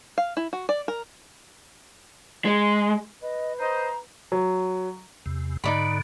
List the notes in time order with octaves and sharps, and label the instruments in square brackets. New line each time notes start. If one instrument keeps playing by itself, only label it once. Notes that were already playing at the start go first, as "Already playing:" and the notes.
[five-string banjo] F5
E4
F#4
D5
A#4
[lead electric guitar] G#3
[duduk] B4 [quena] D#5
[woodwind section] C5 D#5 [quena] A#5
[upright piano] F#3
[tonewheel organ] E2 C3
[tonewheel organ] G#2 D3 [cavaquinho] D#4 D5 B5